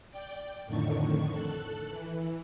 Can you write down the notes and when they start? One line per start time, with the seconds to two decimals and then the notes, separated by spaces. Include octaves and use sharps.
0.11 D5 G5
0.67 F2 A2 D3 D#3 C#6 C#7
1.30 A4 F#6
1.89 E3